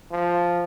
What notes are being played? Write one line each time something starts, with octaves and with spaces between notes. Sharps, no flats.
F3